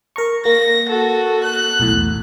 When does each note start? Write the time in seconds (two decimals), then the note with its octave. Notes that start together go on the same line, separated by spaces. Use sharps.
0.16 A#4 A#5 C#6
0.45 A#3 A#6
0.89 F#4 A4
1.43 F#6
1.80 B1 E2 A2